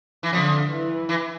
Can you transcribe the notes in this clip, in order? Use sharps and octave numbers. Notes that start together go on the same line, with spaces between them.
E3
D3 F3
E3
E3